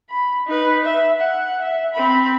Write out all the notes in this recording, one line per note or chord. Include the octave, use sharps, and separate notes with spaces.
B5
D#4 B4
E5
F#5
E5
C4 B5